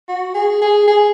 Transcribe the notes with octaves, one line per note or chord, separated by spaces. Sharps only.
F#4
G#4
G#4
G#4